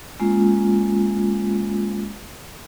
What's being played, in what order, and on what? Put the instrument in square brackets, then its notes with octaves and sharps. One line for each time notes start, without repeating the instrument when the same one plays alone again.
[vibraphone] G#3 A#3 C#4 F4